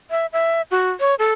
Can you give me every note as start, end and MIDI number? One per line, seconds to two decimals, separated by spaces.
0.11 0.26 76
0.33 0.62 76
0.71 0.90 66
1.00 1.15 73
1.19 1.33 69